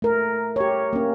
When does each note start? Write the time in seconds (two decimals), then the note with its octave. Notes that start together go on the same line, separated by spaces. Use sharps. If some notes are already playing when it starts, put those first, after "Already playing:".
0.02 A3 A#4
0.56 G4 C#5
0.93 A#3 C#4